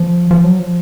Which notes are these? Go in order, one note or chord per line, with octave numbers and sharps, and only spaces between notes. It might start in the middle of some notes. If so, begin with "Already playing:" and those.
Already playing: F3
F3
F#3
F3